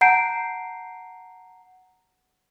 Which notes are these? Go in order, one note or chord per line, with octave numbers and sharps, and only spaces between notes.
F#5 A5 A#5 G6 C7 D7